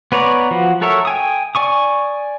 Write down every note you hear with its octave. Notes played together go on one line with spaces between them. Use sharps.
B3 B4 C#5 D5 A#5
F3 F#4
F#4 A4 A#4 C#5 E5
G5 G#5 D#6
D5 G#5 C#6 D#6